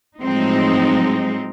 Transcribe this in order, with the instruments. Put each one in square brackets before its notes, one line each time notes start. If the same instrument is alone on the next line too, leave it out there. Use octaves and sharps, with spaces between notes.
[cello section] A2 F3 F#3 G#3 C4 D#4